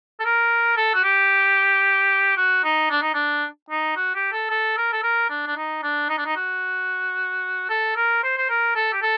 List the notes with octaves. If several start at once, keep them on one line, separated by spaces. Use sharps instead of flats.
A4
A#4
A4
F#4
G4
F#4
D#4
D4
D#4
D4
D#4
F#4
G4
A4
A4
A#4
A4
A#4
D4
D4
D#4
D4
D#4
D4
D#4
F#4
A4
A#4
C5
C5
A#4
A4
G4
A4